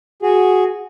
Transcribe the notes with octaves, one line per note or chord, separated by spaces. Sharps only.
F#4 G#4